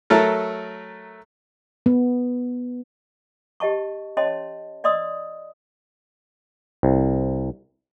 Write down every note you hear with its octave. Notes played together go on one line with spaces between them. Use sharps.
F#3 A3 A4 A#4
B3
G4 D#5 A5 C#6
C#4 C#5 D#5 A5 C6
D5 D#5 C6 D#6 E6
C2